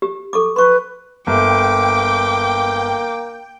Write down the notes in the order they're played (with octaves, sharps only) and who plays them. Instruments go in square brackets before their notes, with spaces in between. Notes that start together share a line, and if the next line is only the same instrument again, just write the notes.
[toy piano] G4
A4 C#6 D6
[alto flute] B4 [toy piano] C6 C#6
[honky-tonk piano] G1 [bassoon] A#3 [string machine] G5 [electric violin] D6